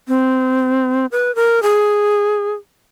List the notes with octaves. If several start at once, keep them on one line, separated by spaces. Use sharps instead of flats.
C4
B4
A#4
G#4